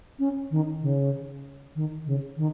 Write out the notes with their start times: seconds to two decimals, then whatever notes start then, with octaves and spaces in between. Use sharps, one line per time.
0.19 C#4
0.51 D#3
0.82 C#3
1.75 D#3
2.06 C#3
2.37 D#3